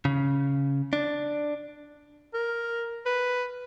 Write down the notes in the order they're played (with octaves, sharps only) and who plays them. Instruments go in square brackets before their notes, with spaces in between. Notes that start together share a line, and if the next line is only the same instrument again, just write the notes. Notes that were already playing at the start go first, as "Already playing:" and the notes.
[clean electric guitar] C#3
D4
[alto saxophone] A#4
B4